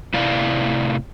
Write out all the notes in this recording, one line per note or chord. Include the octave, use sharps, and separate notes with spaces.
A2 C3 E4 D5 F5